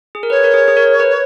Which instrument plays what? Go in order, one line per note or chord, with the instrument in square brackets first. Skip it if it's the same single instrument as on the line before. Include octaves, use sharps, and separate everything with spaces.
[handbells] G#4
A#4
[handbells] B4 [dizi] C#5
[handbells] A#4
G#4
G#4
A#4
B4